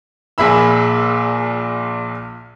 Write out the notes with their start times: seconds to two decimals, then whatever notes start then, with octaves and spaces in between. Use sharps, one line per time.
0.38 A#1 A#2 G#4 E5 B5 E6